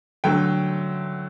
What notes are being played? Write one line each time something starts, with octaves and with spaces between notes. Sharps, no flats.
D3 F#3 A3 G5